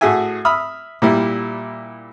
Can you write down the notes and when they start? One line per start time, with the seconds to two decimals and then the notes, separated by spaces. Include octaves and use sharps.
0.01 A2 F#4 G#4 E5 G#5
0.45 E5 B5 D#6 F6
1.02 A#2 G3 E4